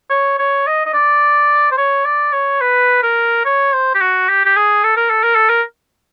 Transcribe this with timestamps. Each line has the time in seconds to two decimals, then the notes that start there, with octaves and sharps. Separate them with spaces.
0.10 C#5
0.39 C#5
0.67 D#5
0.86 D#5
0.94 D5
1.72 C5
1.78 C#5
2.05 D5
2.33 C#5
2.61 B4
3.03 A#4
3.45 C#5
3.73 C5
3.95 G4
4.01 F#4
4.29 G4
4.45 G4
4.57 G#4
4.84 A4
4.97 A#4
5.11 A4
5.24 A#4
5.35 A4
5.49 A#4